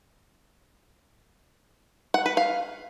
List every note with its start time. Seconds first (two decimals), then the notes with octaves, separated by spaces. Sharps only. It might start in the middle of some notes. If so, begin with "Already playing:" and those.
2.14 F#5
2.26 B4
2.37 F5